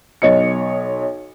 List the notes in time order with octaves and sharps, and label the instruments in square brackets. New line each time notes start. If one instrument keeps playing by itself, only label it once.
[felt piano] B1 C#5 D#5 C#7